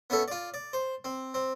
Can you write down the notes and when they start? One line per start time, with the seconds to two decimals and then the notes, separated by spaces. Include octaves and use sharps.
0.10 B3 C#4 E4 A4
0.28 F4 D5
0.54 D5
0.73 C5
1.04 C4
1.34 C4